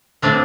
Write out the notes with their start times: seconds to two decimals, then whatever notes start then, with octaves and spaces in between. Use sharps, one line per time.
0.22 A2 F3 A3 C4 D4